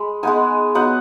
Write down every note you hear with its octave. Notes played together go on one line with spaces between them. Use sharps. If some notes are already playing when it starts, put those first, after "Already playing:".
Already playing: G#3 B5
G#3 B3 D#4 G#5
F#3 B3 D#4 F#5